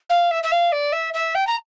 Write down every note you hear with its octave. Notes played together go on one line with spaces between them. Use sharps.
F5
E5
E5
F5
D5
E5
E5
G5
A#5